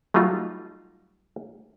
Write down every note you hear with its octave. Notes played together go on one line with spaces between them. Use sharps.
F#3 G3 A3 D#4 F4